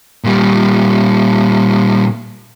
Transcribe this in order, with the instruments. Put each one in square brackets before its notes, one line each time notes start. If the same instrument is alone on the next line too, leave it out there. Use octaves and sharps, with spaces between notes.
[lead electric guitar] A#2 G3